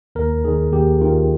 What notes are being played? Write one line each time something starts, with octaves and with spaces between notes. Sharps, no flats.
D#2 A#4
D#3 G#4
D#2 G4
D#3 F4